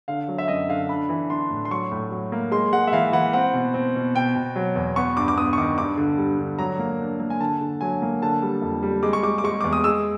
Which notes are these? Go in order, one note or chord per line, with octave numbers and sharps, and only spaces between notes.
D3 F5
F#3
E5
F#2 D#5
D3 F5
D4 B5
E3
D4 C6
A2
C6
F#3 C#6
A2
F#3
A#3
G#3 C6
G#3 F#5
E5
E3 F5
E3 F#5
C4 F#5
B2
C4
B2
B2 G5
B2
F#3
E2
B3 C#6
G2 D6
D6
B3 D#6
C#6
D#3 D6
G2 D6
D3
G3
D3
F#3 A#5
A#3
D4
A#3
G#5
D3 A5
D3
F#3 G#5
A#3
D3 A5
G3
F2
G3
G#3 D6
C#6
G#3 D6
D6
G#3 C#6
E2 D6
D#6
G#3 E6